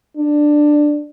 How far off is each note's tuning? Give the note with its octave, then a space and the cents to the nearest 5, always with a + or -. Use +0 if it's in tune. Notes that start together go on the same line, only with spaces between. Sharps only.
D4 +10